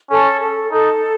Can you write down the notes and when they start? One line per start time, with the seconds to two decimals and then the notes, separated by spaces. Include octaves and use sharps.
0.10 C#4 A4
0.41 A4
0.72 D#4 A4